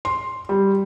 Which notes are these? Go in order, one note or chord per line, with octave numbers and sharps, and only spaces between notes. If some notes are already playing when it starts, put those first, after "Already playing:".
C6
G3